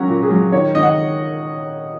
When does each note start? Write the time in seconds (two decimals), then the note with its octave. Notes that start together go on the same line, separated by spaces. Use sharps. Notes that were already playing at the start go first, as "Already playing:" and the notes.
Already playing: F#3 C#4 F#4 A#5
0.09 A#2
0.23 G#4
0.31 F#3
0.52 D#3 C#5
0.75 D#3 D#5
0.83 F#5